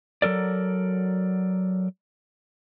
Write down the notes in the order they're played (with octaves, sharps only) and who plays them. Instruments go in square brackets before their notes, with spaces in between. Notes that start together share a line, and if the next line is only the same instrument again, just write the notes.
[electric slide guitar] F#3 A4 A#4 D5